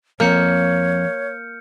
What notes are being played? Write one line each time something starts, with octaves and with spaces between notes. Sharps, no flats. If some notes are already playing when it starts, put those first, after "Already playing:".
F2 A#3 C#5 F6 G6 C#7